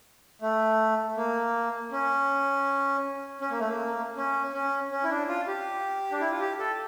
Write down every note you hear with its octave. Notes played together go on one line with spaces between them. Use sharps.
A3
A#3
C#4
C#4
A#3
A3
A#3
C#4
C#4
C#4
E4
D4
F4
G4
D4
E4
F4
G4
A4